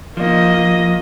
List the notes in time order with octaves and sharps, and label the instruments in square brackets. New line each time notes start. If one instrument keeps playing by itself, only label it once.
[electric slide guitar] F3 [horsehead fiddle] A#3 D#5